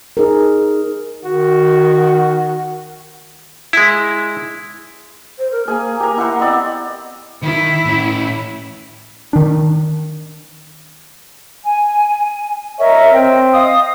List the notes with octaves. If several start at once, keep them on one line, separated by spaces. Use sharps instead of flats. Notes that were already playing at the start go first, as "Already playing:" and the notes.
D#4 G#4 A#4
D#3 F#4
G#3 E4
C5
A#4
A#3 G#4 G#5
G4 A#4
E4 C5 F#5
B3 C4 D5 D#5
D#3 E4
A2 C#4
D#3 D4
G#5
A#4 C#5 D#5 E5
C4 G5
D#5 F5 D#6